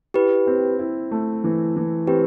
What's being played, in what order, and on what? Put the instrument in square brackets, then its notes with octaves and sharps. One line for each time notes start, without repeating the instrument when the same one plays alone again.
[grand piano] E4 [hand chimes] G4 B4
[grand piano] C4
E4
A3
E3
E3
[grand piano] C4 [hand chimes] G4 B4